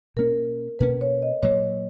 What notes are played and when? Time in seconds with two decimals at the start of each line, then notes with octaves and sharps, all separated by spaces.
0.16 B2 A#3 C#4 A#4
0.79 B2 A#3 C#4 B4
1.01 C#5
1.22 D#5
1.43 A#2 F#3 A#3 C#5